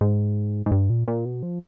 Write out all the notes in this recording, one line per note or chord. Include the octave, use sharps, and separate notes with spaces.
G#2
G#2
G2
A#2
A#2
B2
F3